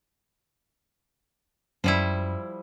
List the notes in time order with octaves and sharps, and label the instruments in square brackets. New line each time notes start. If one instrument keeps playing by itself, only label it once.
[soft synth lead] F#2 [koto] F3 G3 E4